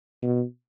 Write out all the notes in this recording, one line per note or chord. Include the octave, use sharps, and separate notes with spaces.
B2